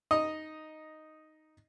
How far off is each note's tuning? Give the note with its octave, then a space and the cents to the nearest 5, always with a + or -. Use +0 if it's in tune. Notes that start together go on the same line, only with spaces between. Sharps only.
D#4 +0 D#5 +0